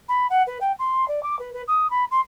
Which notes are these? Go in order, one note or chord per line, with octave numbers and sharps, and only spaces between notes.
B5
F#5
B4
G5
C6
D5
D6
B4
B4
D#6
B5
C6